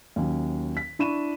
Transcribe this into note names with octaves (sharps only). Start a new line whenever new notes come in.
D#2 F#3 C#4
B6
D4 E4 B5 C#6 D#7 E7